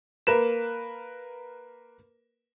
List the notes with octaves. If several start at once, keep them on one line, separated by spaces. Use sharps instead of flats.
A#3 A#4 B4 E7